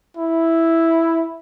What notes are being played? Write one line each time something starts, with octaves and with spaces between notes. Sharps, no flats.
E4